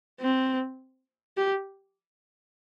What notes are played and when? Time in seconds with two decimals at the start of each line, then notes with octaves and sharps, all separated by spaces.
0.21 C4
1.37 G4